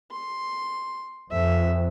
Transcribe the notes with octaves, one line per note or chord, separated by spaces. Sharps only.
C6
F2 E5